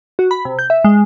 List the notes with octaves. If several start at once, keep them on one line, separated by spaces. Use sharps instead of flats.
F#4
B5
C3
G6
E5
G#3